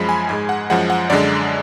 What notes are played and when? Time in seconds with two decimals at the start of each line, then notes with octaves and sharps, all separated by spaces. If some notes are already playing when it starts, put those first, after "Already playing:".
Already playing: F#2 F3 G#3 B5
0.09 G#5
0.29 G#2 G#3 G#5
0.49 F#5
0.70 F#2 F3 G#3 F#5
0.90 F#5
1.10 F#2 D3 G#3 D5